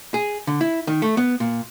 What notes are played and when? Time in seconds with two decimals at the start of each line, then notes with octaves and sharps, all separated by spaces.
0.14 G#4
0.47 D3
0.61 E4
0.87 D#3
1.02 A3
1.17 B3
1.40 A#2